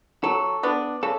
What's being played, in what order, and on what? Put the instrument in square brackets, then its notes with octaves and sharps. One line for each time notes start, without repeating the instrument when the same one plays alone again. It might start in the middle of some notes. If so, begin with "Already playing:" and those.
[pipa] F#3 [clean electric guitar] A4
[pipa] B3 D4
[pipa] C#3 [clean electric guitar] A4